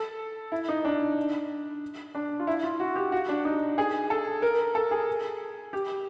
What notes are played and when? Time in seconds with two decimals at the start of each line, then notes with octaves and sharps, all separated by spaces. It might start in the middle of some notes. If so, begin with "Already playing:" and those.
Already playing: A4
0.52 E4
0.68 D#4
0.85 D4
2.15 D4
2.39 F4
2.47 E4
2.63 F4
2.80 F#4
2.96 G4
3.12 F#4
3.29 D4
3.45 D#4
3.78 G#4
4.10 A4
4.42 A#4
4.75 A4
4.91 G#4
5.73 G4